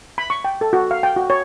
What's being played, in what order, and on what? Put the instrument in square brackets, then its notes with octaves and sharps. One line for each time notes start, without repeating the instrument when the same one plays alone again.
[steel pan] B5
C#6
G5
A4
F#4
F5
G5
F#4
C#5